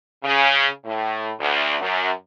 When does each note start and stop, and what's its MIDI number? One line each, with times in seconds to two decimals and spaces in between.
0.24 0.66 49
0.85 1.30 45
1.39 1.75 38
1.80 2.10 42